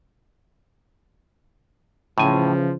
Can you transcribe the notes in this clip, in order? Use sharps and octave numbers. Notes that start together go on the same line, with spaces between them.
A2 C#3 E3 F3 G#5